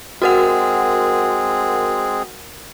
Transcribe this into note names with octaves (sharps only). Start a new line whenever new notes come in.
G#3 C4 F#4 G#4 A#4 F#5